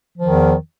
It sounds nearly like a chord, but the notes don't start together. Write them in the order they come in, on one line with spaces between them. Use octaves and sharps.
F3 D#3 E2